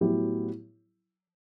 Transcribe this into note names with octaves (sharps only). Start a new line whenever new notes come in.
A2 F#3 B3 E4 G4